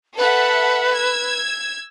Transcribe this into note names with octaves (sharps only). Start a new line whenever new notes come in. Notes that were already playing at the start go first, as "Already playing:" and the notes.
A4 B4 E5 F#5
E6 G#6